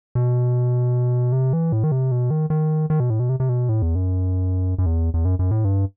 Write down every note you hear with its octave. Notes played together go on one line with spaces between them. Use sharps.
B2
C3
E3
A2
D#3
C3
B2
D#3
D#3
D#3
B2
A2
B2
C3
C3
B2
A2
E2
F#2
F#2
E2
E2
F#2
F#2
A2
G2